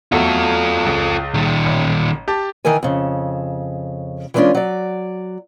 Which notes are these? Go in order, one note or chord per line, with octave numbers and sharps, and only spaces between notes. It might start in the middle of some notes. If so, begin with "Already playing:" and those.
E2 F#3 A3 F4 A4
C#2
A#2 D#3
A1
G4 A5
D#3 E3 E4 A#4 G#5
F2 C#3
E3 G3 G#3 C#4 D4 F4
F#3 D5